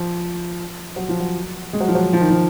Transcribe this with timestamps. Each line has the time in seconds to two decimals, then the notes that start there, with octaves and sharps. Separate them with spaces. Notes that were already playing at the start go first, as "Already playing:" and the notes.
Already playing: F3
0.96 F#3
1.09 F3
1.20 F#3
1.73 G#3
1.80 F#3
1.88 F3
1.95 F#3
2.13 F3
2.21 D#3
2.30 F3